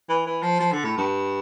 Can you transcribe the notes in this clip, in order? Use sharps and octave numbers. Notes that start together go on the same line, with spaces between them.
E3
E3
F3
F3
D3
A2
G2